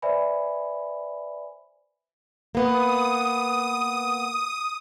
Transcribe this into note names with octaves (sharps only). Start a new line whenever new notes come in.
B4 C5 D5 E5 G#5 B5
A#3 B3 D#6